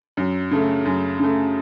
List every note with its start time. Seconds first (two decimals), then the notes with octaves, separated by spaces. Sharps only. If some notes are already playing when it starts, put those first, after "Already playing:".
0.17 F#2
0.51 C#3 A3
0.86 F#2
1.20 C#3 A3